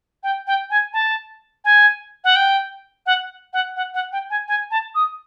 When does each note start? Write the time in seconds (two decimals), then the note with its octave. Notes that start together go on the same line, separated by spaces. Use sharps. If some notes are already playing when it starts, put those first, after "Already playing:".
0.23 G5
0.47 G5
0.70 G#5
0.93 A5
1.65 G#5
2.24 F#5
2.36 G5
3.06 F#5
3.53 F#5
3.76 F#5
3.94 F#5
4.12 G5
4.30 G#5
4.48 G#5
4.71 A5
4.95 D#6